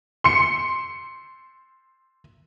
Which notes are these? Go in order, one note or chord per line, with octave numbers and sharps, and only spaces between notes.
C6 C#7